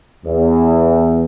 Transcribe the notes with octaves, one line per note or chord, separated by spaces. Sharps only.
E2